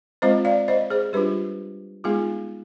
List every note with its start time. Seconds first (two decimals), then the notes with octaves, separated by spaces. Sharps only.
0.22 G#3 C4 F4 C5 D#5
0.45 D5 F5
0.68 C5 D#5
0.90 G#4 C5
1.13 G3 D4 F4 G4 B4
2.04 G#3 B3 D#4 F4 G#4